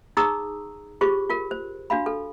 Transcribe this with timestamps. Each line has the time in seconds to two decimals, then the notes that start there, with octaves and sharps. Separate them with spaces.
0.17 D#4 G#4 A#5 C#6 D#6 E6
1.01 F4 G4 G#4 C5 C#6
1.30 F4 A#4
1.51 C5
1.90 D4 F#4 F5 B5
2.06 A4